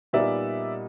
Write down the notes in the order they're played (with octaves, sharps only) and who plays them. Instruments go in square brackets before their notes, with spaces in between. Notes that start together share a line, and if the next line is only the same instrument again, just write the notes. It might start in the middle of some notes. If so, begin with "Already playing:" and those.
[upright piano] A#2 G3 B3 D#4 D5 E5